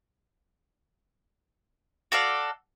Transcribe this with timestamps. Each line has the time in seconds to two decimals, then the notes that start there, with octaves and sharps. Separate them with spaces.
2.12 F#4 A4 D5 F5